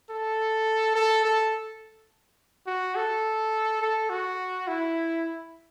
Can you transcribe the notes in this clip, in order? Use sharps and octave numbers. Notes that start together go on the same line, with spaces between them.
A4
A4
A4
F#4
A4
A4
F#4
E4